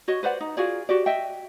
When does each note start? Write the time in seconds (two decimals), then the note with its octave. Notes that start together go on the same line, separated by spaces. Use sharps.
0.08 F#4 C#5 D#5
0.23 B4 C5 D5 F#5
0.40 D#4
0.57 F4 F#4 G#4 D5
0.89 F#4 G4 D5
1.06 D#5 E5 G5